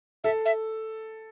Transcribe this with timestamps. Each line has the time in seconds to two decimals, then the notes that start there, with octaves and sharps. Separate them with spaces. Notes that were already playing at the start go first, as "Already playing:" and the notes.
0.24 A4 E5
0.45 E5